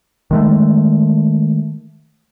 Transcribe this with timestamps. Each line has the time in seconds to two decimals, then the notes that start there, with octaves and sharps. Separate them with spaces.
0.31 D#3 G#3 A3